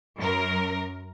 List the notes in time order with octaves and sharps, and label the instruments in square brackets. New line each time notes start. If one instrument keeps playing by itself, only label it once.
[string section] F#2 A#4